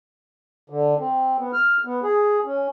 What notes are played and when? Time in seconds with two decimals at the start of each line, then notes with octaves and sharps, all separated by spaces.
0.70 D3
0.99 C4
1.39 B3
1.53 F6
1.85 B3
2.03 G#4
2.45 C#4